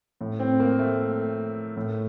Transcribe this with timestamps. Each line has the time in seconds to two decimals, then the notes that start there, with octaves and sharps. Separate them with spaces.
0.21 A2
0.39 C4
0.60 A#3
0.79 A3
1.77 A2